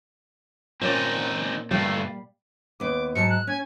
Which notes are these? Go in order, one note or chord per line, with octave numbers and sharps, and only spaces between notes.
A#2 C4 C#4 D#4 D5
G2 G3 A3 D5 F5
D#2 B3 D6
G#2 F#3 A5 C#7
F#6
C#4 G#5